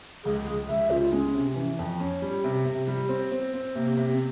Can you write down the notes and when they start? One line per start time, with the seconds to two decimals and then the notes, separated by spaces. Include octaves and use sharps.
0.25 C#2 G#4
0.47 C#2
0.69 C#2 E5
0.90 C#3 F4
1.12 G#3 C#4
1.34 C3
1.56 E3
1.79 F2
2.00 C#4
2.22 G3
2.44 C3
2.65 C3
2.88 G3
3.09 C4
3.31 C4
3.54 C4
3.75 C3 A#3
3.97 C3
4.14 C4